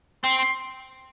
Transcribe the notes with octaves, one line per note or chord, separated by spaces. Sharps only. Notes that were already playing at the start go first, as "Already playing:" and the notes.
C4 C6
C6